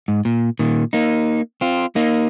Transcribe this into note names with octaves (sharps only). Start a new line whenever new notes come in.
G#2
A#2
A#2 D#3
A#3 D#4
C4 F4
A#3 D#4